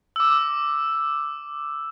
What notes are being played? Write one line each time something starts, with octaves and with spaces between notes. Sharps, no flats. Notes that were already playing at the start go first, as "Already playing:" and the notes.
D6 E6